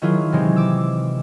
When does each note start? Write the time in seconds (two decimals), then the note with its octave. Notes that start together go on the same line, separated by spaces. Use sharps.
0.02 D#3 F#3 E4 F4 G#4
0.32 C3 E3 G#3 C4
0.56 D6 E6